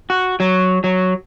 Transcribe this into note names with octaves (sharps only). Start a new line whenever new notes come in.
F#4
F#3
F#3